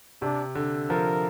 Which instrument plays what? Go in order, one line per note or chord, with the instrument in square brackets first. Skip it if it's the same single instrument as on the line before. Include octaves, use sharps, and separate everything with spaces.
[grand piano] C3 [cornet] D4
[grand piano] D3
[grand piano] F3 [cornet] A#4